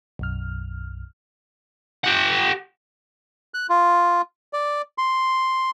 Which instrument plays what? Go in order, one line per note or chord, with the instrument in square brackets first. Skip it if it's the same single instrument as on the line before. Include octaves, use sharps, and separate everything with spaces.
[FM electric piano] B1 F#2 F6
[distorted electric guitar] G4 F#5
[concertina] F#6
F4
D5
C6